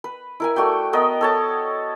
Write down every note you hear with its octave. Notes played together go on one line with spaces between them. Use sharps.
B4
E4 A#4 G#5
A3 F#4 D5 G5
B3 A#4 D#5
A4 C#5 A5